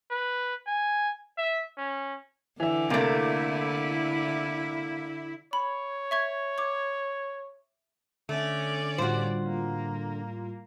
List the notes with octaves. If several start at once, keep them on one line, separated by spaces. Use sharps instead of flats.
B4
G#5
E5
C#4
D3 E3 E5
C3 A3 A#3 E4 A#4
C#5 B5
E5 C#6 G#6
D6 G#6
D3 A3 C#4 D5
A2 G3 F4 F#4 C5
A#3